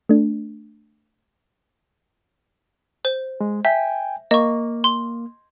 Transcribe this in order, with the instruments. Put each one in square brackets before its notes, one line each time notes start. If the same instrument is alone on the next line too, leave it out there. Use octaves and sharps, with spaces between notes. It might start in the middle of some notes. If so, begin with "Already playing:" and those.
[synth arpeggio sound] A3 D4
[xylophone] C5
[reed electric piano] G#3
[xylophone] E5 [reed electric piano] G5 G#5
[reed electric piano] A#3 [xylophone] D#5 C#6
[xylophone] C6